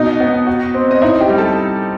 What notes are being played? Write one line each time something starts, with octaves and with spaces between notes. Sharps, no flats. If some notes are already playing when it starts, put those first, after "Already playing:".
Already playing: B2 D#4 D#5
B3
F#4
C4
D#5
D#4 E4 E5
G4 G5
G3
A4 A5